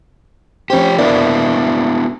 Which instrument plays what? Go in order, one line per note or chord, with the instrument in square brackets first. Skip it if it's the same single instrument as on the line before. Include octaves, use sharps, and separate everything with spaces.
[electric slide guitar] F3 G4 [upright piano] C#4 C5
[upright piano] F#1 A#3 D5 [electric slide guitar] B3 D4 E4